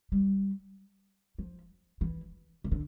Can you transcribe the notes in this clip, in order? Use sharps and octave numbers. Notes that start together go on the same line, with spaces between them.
G3
F3
E3
D#3
D3